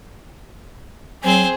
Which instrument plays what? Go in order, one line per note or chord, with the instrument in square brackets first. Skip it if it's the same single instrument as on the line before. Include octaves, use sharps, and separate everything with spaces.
[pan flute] F#3 [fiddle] C4 C5 [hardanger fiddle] G#4